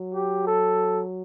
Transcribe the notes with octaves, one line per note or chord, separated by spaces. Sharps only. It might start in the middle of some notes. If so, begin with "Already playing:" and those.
Already playing: F#3
G4
A4